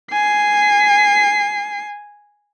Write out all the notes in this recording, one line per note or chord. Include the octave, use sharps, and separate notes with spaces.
G#5 C7